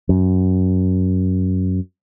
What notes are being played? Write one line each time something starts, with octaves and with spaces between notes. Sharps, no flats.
F#2